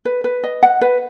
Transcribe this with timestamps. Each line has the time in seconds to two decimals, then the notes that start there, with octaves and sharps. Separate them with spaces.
0.05 B4
0.24 B4
0.44 D#5
0.63 F#5
0.81 B4